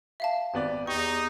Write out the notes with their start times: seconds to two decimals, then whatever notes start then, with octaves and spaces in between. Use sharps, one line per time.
0.20 E5 F5 A5
0.54 G#1 B3 D5
0.87 E2 D#4 G4 C#6